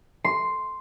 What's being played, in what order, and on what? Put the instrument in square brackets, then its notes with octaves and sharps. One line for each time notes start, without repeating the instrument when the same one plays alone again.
[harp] C6